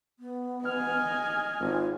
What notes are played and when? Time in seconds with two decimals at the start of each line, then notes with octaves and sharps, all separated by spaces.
0.19 B3
0.65 D#5 G#5 F6
1.60 G#1 F4